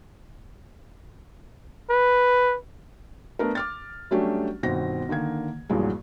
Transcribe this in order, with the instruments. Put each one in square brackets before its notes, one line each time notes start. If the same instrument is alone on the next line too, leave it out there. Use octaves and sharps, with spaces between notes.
[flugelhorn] B4
[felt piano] A3 B3 D4 A#4
D6 F6 A6
F#3 G3 A3 C#4 D4 G4
G1 B2 D#3 C4 A#6
D3 D#3 A#3 G#6
E2 G2 A#2 F#3 G#3